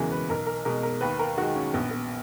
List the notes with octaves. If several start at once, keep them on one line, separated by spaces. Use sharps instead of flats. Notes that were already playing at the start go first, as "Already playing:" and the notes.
Already playing: E1 E2 C#3 E3 G#3 F#4 G#4 A#4
B4
B1 A#4
A#4
B2 G#3 A#4
A#4
D#2 B4
A#4
D#3 G#3 F#4
C#4
A#1 B3
B3